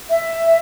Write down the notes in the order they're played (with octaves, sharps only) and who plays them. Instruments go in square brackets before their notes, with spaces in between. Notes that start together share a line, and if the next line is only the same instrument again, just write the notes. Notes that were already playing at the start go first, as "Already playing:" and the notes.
[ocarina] E5